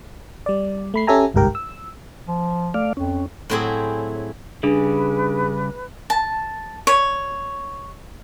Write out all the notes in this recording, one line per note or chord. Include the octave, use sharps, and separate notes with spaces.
G3 D5
A3 B5 C7
C#4 G4 A4 E5 G#5 A#5
G1 C2 G#2 G4 A#4 G5
E6
F3
A3 D5 F5
F2 C#4
A2 F#3 C4 E4 G#4
C#3 G3 D4 G#4 B4
A5
C#5